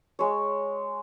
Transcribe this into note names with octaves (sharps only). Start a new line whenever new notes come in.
G#3 C#5